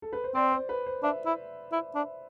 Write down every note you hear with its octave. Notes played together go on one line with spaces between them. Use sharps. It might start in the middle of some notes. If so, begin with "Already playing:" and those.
A4
B4
C5
C4 D5
C5
B4
C5
D4 E5
E4
E4
D4